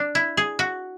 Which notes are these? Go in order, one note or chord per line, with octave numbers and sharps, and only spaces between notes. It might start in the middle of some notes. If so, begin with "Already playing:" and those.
Already playing: D4
E4
G#4
F#4